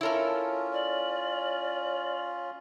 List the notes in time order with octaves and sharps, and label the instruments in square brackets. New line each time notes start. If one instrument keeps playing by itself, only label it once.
[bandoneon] C#4 F4 [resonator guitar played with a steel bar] E4 A4 A#4 [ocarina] C#5
[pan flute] D5